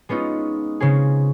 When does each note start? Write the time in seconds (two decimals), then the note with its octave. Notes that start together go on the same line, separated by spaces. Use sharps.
0.09 G#3 B3 C#4 D#4 F4
0.80 C#3 C4 C#4 G#4